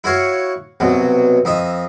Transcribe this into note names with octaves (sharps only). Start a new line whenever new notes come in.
E4 F#4 C#5 F5
C2 B2 F#3
F2 D#5 E5